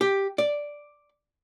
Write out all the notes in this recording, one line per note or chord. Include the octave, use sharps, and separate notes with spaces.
G4
D5